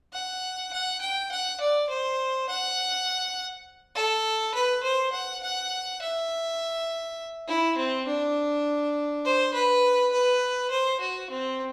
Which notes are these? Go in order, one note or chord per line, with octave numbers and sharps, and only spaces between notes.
F#5
F#5
G5
F#5
D5
C5
F#5
A4
B4
C5
F#5
F#5
E5
E4
C4
D4
C5
B4
B4
C5
F#4
C4